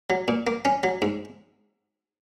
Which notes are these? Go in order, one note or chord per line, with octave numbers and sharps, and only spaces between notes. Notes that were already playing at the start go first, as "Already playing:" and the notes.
F#3
A#2
A#3
C#4
F#3
G#2